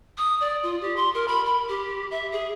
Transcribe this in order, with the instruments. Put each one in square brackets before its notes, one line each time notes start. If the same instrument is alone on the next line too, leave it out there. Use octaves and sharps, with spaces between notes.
[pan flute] D#6
D5
F4
G4
C6
A#4
B5
B5
G4
E5
G#4